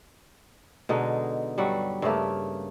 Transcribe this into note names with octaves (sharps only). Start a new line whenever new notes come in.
B2 D3 G#3 D#4
G2 F#3 G3 F#5
G2 C#3 A3 A#3